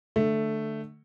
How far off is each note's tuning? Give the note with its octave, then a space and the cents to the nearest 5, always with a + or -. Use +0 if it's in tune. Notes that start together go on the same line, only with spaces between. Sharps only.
D3 +25 A3 +0